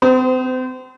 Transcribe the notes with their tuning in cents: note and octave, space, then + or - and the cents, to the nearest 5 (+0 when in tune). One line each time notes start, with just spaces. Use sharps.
C4 -40 C5 -25 D#6 +20